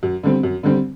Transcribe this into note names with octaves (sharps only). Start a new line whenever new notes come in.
F#2
D3 G3 C4
F#2
D3 G3 C4